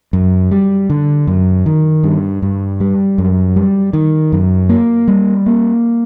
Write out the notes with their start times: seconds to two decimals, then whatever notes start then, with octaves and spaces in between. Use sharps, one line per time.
0.13 F#2
0.51 G3
0.90 D3
1.27 F#2
1.66 D#3
2.03 G2
2.42 G2
2.80 G3
3.18 F#2
3.56 G3
3.93 D#3
4.32 F#2
4.69 A#3
5.08 G3
5.46 A#3